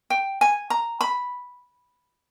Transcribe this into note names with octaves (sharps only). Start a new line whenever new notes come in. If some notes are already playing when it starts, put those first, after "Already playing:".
G5
G#5
A#5
B5